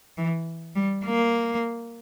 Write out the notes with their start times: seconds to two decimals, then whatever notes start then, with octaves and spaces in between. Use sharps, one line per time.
0.18 E3
0.76 G3
1.05 A#3